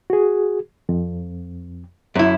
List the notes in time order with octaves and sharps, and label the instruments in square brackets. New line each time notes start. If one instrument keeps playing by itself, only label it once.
[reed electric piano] F#4 G#4
F2
[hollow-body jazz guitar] F#2 E4